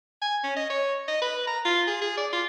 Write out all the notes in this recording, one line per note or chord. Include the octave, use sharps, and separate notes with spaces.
G#5
C#4
D#5
C#5
D#5
B4
A#5
F4
G#4
G#4
D5
F4